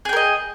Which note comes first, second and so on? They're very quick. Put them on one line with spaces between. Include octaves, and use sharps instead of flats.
G#4 G5 A#4 D#5